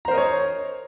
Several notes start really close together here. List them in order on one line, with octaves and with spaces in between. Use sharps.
A#5 C5 A#4 D#5 C#5